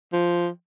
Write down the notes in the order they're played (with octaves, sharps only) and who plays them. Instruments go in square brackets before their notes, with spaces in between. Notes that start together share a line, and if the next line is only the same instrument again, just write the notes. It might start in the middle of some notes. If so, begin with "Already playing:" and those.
[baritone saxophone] F3